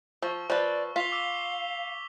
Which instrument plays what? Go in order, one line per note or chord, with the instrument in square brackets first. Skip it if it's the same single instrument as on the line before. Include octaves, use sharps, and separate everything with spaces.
[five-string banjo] F3 [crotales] C#6 E6
[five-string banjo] F3 B4 [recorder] D5
[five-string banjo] F4 [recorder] F5 [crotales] B6 F7 G7
[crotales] D6 E6 F7